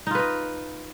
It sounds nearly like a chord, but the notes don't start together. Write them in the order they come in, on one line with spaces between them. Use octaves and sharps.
D#4 F4 B4 D#5